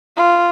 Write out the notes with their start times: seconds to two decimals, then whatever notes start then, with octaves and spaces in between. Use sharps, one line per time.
0.17 F4